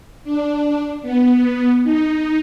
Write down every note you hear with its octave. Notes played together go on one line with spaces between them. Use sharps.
D4
B3
D#4